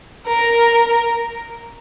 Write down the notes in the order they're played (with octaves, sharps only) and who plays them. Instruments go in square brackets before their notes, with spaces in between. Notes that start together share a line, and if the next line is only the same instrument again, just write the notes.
[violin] A#4